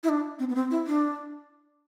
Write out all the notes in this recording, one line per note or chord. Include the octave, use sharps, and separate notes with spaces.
E4
D4
C4
B3
C4
E4
D4